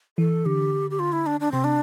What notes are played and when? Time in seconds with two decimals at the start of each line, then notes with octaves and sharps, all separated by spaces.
0.18 E3 A4
0.46 D3 G4
0.91 G4
0.99 F4
1.13 E4
1.26 D4
1.40 D4
1.52 C3 C4
1.64 D4